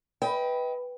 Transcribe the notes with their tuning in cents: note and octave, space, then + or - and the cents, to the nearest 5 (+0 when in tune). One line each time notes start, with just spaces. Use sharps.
B4 +0 D#5 +35 G5 +0